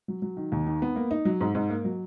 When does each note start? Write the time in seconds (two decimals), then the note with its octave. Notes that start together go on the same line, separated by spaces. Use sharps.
0.08 F#3
0.22 F#3
0.37 D#3
0.52 D#2
0.66 D#3
0.82 B3
0.96 A#3
1.11 D#4
1.25 F#3
1.41 G#2
1.55 G#2
1.70 A#3
1.85 F#3